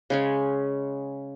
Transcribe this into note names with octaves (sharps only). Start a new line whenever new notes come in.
C#3 G#3 C#4